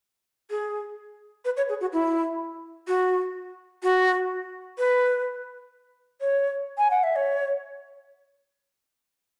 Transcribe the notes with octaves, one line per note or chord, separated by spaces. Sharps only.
G#4
B4
C#5
G#4
F#4
E4
F#4
F#4
B4
C#5
G#5
F#5
E5
C#5